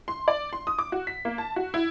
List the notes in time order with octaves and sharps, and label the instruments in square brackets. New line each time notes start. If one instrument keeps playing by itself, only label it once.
[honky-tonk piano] C6
D5
C6
D#6
D6
F#4
B6
A#3
A5
F#4
E4